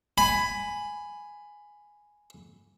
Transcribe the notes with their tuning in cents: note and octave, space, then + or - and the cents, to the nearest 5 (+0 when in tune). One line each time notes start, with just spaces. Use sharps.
G#5 +0 B5 +10